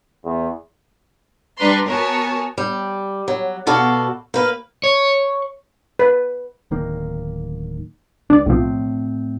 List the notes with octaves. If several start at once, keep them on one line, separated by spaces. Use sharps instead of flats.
E2
G3 D4 B4 A#5 C6
B3 F#4 A#4 C#5 G#5 A5
G3
F#3
B2 F#4 A4 D5 F5
A#3 B4 F5
C#5
B4
D1 D#3 A#3
C#2 D4 D5
B1 A2 F3 C4